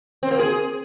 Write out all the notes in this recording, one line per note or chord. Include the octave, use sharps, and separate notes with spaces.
C4
A#3
G#4